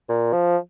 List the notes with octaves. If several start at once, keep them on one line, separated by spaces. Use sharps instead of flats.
A#2
F3